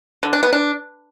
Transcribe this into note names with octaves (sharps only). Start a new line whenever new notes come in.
D3
D4
B3
D4